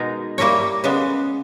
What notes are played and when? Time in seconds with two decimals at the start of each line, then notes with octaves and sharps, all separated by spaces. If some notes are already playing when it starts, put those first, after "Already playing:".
Already playing: B2 G#3 D#4 A#4
0.38 G3 A#3 E4 A#4 C#5
0.84 C#3 G#3 B3